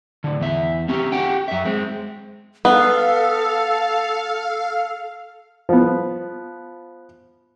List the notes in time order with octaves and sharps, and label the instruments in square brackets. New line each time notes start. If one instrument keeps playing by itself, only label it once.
[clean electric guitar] A2 D3
E2 E5
C4 C#4 G4
F#4 G4 F#5 G5
F#2 E5
G#3 C4
[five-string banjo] B3 [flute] A4 [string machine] F5
[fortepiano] F3 B3